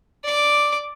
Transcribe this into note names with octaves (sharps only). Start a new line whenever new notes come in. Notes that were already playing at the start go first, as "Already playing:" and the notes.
D5 D6